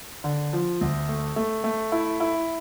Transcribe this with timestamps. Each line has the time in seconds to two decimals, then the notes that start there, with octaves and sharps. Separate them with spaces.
0.24 D3
0.53 F3
0.81 D2
1.09 A3
1.36 A3
1.64 A3
1.92 E4
2.20 E4